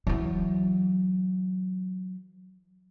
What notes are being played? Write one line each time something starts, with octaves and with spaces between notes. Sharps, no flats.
E3 F#3